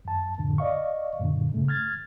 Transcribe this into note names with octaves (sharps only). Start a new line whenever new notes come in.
F#2 A5
C2 F2 A2 D3
D5 D#5 F5 C#6
F#2 A#2 D3
G2 C#3 A3
F6 G#6 A6